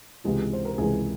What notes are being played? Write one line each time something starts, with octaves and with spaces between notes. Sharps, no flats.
C#2 C3 E3 G#3 G4
C5
A#4
C#2 C3 E3 G#3 G#4